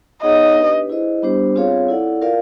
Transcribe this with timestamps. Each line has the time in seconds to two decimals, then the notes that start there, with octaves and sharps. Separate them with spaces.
0.23 B3 D#4 G#4 C#5 D#5 F#5
0.56 D4 G4 B4
0.90 E4 G#4 C5 D#5
1.22 G3 B3 D4 G4 C5
1.55 C4 F4 G#4 C#5 F5
1.89 E4 A4 D5 F#5
2.22 F4 A#4 D5 F5